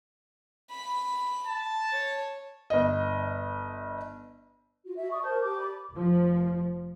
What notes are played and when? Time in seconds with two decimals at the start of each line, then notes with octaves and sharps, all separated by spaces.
0.72 B5
1.47 A5
1.92 C#5
2.70 G1 D#5
4.85 F4 F#4
4.97 F#4 E5
5.11 D5 C#6 D#6
5.23 A#4 C5 A5 G6
5.42 G4 D6
5.58 D5 B5 D6
5.92 F1 F3